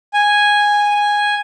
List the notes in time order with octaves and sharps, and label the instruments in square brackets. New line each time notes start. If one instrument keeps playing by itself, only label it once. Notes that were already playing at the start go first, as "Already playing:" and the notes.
[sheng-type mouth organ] G#5